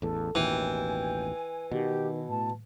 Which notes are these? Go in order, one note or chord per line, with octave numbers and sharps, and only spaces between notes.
A1 E2 A4
A1 D#2 B2 E3 G5 G#5
B2 D#3 G4
A2 A5